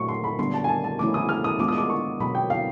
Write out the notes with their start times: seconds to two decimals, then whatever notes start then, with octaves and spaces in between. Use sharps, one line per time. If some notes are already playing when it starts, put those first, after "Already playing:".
Already playing: A#2 F#3 A3 C#6
0.08 C6
0.24 B5
0.39 D3 G3 B3 D4 C6
0.54 A5
0.64 G#5
0.69 A5
0.84 A5
0.99 F3 A3 C#4 E4 D6
1.14 D#6
1.29 F6
1.44 D#6
1.59 G#3 B3 D4 F4 D6
1.68 D#6
1.78 D6
1.90 C#6
2.20 B2 F#3 B3 B5
2.35 G5
2.50 F5